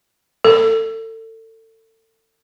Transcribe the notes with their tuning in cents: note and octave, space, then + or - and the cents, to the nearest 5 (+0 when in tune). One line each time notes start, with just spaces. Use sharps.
A4 +30